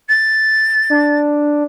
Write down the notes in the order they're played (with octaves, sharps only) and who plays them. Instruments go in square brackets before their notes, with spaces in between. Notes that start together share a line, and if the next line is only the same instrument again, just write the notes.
[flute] A6
[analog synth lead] D4